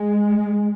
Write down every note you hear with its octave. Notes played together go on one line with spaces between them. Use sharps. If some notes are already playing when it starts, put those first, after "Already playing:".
Already playing: G#3